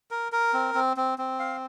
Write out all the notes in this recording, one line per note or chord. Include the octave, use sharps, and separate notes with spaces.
A#4
A#4
C4
C4
C4
C4
F5